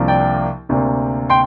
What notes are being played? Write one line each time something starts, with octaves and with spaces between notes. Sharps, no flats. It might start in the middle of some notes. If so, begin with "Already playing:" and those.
Already playing: C2 C3 F3 A#3 D4
D5 G5
D2 C3 A#3 D4
G5 C6